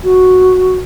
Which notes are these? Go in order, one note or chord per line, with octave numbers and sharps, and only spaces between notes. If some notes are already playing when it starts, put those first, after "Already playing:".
F#4